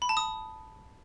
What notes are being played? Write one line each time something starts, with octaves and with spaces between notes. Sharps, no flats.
B5
A5
D#6